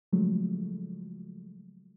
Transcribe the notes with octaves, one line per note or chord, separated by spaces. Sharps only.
C#3 F3 F#3 G#3 A3